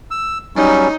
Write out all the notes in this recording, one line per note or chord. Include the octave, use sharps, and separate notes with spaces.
E6
F#3 G3 C#4 D#4